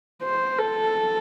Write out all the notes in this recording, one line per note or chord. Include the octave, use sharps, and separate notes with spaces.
C5
A4